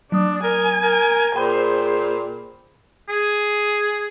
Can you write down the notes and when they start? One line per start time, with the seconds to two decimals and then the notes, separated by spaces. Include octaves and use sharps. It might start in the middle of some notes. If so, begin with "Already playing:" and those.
0.12 F#3 D4 D#6
0.44 A#4 G#5
0.82 A#4
1.36 A#2 G#4 C5 G5 B5
3.09 G#4